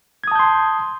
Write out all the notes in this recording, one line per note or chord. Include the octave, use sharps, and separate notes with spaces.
A5 C6 D#6 G6 G#6